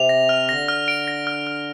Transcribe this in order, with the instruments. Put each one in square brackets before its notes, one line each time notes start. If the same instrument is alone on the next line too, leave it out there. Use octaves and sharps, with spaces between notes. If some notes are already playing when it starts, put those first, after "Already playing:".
Already playing: [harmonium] C3 [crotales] F7
[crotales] A#6
F6
[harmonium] D3 [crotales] A#6
[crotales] F6
D7
A#6
F6
F6